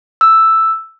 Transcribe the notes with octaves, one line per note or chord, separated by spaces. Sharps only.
E6